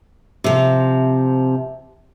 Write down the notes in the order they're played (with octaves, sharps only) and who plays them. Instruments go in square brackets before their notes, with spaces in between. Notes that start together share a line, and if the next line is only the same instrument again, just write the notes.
[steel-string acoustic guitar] C3 F3